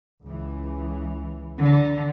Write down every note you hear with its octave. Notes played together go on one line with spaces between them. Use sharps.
C#2 E3
D3